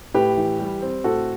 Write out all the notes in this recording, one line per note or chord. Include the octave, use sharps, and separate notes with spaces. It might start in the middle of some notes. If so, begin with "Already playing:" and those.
A2 G4 B4
E3
G3
C4
A2 F#4 A4